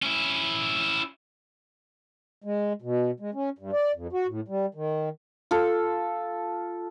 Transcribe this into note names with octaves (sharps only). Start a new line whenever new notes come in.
C#4 E4
G#3
B2
G#3
C#4
G2
D5
F2
F#4
A2
G3
D#3
F4 A4